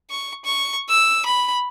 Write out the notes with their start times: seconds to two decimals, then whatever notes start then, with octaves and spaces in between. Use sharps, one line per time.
0.10 C#6
0.45 C#6
0.90 E6
1.26 B5